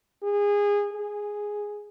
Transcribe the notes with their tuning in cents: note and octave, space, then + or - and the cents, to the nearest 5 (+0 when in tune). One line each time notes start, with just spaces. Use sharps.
G#4 -25
G#4 -5